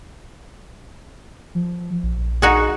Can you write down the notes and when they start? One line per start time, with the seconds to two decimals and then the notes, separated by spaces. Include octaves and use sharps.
1.55 F3
2.03 A#1
2.42 D#4 F#4 G#4